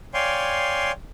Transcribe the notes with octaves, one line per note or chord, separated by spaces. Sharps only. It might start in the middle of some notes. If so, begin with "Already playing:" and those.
C#5 D5 F5 G5 G#5 C6